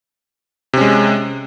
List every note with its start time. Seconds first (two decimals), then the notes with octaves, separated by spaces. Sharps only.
0.73 C3
0.77 C#4
0.81 G#3